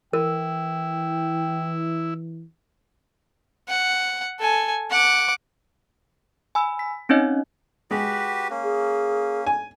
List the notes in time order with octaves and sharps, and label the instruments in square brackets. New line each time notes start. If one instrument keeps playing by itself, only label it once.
[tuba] E3 [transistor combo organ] E4 [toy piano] A#4 [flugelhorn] G5
[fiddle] F#5
A4 G#5
F#5 D6
[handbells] G#5 B5 E6
B6
C4 C#4 D#4 C#5 D#5
[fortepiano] G#3 [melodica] F#4 G4 B4
[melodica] A#3 C#4
[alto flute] G#4
[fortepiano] G#5